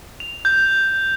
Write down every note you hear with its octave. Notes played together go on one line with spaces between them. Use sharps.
F7
G6